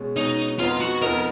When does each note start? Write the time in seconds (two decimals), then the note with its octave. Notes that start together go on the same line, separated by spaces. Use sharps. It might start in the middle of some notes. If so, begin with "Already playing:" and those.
Already playing: B2 G#3 C#4
0.16 B2 G#3 C#4 D#4
0.59 F2 F3 B3 D#4 F4
0.80 F#4
1.02 F2 F3 B3 D#4 A#4